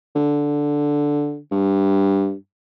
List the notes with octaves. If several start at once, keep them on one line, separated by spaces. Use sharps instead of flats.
D3
G2